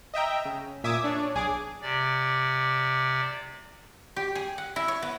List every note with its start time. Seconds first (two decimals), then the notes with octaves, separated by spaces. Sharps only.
0.14 D#5 E5 G5 A#5
0.45 C#3
0.84 A#2 E5 G#5 D6 D#6
1.04 D4 C#5
1.35 B1 G#4 G#5 D6
1.81 C3 D5
4.16 G4
4.35 G#4
4.58 F#5
4.76 E4
4.88 C#5
5.02 B3